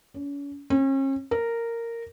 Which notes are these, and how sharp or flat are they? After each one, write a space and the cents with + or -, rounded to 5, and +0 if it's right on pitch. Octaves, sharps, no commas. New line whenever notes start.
C#4 +40
C#4 -40
A#4 -10